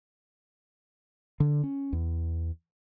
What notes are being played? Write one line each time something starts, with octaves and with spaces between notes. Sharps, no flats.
D3
C#4
E2